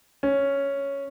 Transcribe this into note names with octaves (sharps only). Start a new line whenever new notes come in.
C#4